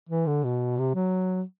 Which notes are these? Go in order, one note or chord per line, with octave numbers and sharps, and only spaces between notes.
E3
D3
B2
C3
F#3